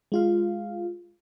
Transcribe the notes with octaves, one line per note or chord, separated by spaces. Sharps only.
G#3 F4 F5